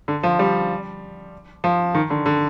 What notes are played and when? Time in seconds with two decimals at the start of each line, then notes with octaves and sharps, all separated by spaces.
0.08 D3
0.23 F3
0.39 G3
1.64 F3
1.95 D#3
2.10 D3
2.26 D3